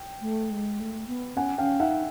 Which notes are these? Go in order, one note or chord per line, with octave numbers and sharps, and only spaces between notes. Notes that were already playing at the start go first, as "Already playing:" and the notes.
Already playing: G5
A3
G#3
A3
B3
C#4 F#5 G#5
C#4 F5 G5
D#4 E5 F#5